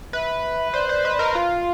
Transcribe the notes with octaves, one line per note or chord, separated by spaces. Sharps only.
B4 E5
C5 D5
C5 D5
B4 D#5
D5
A#4 D#5
F4 F5